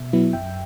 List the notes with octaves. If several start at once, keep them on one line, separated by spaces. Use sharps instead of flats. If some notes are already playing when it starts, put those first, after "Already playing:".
Already playing: B2 E5
F#3 B3 E4
F#2 E5 G5